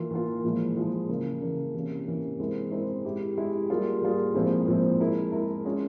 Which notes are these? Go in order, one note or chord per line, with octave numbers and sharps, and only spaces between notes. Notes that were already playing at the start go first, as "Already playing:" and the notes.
Already playing: E3 A#3 F4
E3 A#3 F4
A#2 F3 G#3 E4
A#2 F3 G#3 E4
C#3 E3 A#3
C#3 E3 A#3
C3 E3 A#3 C#4
C3 E3 A#3 C#4
G#3 C4 E4 A#4
G#3 C4 E4 A#4
G#3 E4 G4
G#3 E4 G4
G3 A#3 F4 G#4
G3 A#3 F4 G#4
A#2 F3 G#3 C4 E4
A#2 F3 G#3 C4 E4
G#3 E4 A#4
G#3 E4 A#4
G#3 C#4 F4 G#4